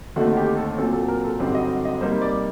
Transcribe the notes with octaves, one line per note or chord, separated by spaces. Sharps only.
D#2 D3 A3 C4 D#4 F#4
G4
A4
A#2 F#3 C4 A4
A4
A#4
A4
G2 D3 F#3 C4 D#4 G4
D#5
D#5
C3 G3 A#3 D#4 C5
D5